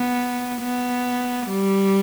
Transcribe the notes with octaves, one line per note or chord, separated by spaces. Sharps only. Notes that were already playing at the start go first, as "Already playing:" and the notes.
Already playing: B3
B3
G3